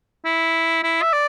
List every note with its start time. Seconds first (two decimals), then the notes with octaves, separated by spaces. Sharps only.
0.25 E4
0.84 E4
1.02 E5
1.13 D5